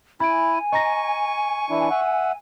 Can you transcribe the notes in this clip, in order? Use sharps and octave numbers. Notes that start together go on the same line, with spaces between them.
E4 G#5 B5 D7
D#5 A#5 C#6 A#6
E3 D4 E4
E5 F#5